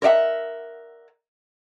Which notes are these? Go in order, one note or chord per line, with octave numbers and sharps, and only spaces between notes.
A#4 C#5 D5 E5 F#5